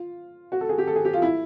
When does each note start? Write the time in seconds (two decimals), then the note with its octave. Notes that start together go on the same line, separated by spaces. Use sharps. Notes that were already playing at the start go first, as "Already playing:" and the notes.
Already playing: F4
0.52 F#4
0.61 A4
0.69 G#4
0.78 G4
0.87 A4
0.96 G#4
1.05 G4
1.13 F4
1.22 E4